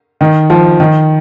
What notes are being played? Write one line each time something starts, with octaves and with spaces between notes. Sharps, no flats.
D#3
F3
D#3